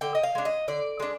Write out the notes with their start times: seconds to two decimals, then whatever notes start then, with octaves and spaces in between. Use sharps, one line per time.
0.01 D3 G5
0.15 D#5
0.23 F5
0.35 G#3 D4
0.45 D#5
0.68 D3 D5
1.00 G#3 D4